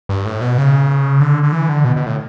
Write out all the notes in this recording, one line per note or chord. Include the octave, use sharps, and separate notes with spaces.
G2
A2
B2
C#3
D3
D3
E3
D3
B2
B2
A2